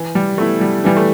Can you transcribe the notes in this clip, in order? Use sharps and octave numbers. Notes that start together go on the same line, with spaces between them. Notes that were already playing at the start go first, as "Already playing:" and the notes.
Already playing: E3
G3
A3 B3 E4
G3
E3 G3
A3